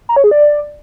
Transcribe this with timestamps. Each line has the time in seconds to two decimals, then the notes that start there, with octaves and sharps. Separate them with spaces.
0.09 A#5
0.16 C#5
0.24 G#4
0.31 D5